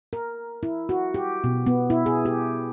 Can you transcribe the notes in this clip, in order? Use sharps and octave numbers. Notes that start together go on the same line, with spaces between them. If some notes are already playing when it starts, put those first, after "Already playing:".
A#4
E4
F#4
G4
B2
B3
E4
G#4
G4